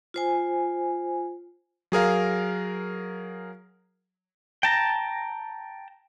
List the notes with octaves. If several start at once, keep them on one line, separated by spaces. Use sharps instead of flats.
F4 C5 G#5
F#3 G#4 A#4 F5
G5 A5 A#5